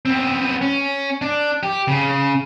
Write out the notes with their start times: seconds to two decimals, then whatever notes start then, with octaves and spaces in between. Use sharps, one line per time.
0.05 B3 C4
0.62 C#4
1.22 D4
1.63 G4
1.88 C#3